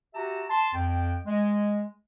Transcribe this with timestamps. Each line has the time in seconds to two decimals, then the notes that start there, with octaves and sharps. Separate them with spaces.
0.14 F#4 G4 E5 A5 A#5
0.50 A5 C6
0.74 F2 G5
1.26 G#3